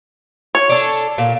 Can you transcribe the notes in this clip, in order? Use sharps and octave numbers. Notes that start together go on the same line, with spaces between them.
C#5
D4 A4
A#2